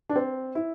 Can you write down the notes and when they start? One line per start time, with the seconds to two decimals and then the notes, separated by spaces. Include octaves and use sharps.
0.09 D4
0.16 C4
0.55 E4